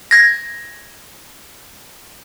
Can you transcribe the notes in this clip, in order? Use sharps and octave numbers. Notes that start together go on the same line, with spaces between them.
G#6 A#6